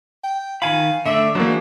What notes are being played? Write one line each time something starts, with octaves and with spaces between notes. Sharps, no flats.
G5
D#3 F5 G#5 B5
D3 A3 D5 E5
E3 F#3 G#3 A#3 D4 C5